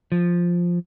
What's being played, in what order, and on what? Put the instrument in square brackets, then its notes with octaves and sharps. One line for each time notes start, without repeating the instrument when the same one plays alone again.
[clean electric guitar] F3